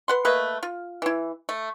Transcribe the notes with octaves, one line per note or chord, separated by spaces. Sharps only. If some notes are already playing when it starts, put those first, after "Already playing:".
B4 F#5 C6
A3 A#3 B4 D#5
F4
E3 E4
A3